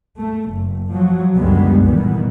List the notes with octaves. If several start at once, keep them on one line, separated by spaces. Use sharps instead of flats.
A3
F#1
F3 F#3
C#2 F#2 D3 G3 G#3 B3
F1 A#2 D#3 E3 G3 B3